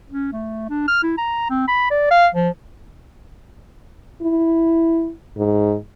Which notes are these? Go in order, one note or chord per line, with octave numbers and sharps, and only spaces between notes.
C#4
A3
D4
F6
E4
A#5
C4
B5
D5
F5
F3
E4
G#2